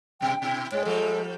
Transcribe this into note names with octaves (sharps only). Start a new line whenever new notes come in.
B2 G3 G5
B2 E4
G#2 G#3 C#5
F3 G3 A3 A4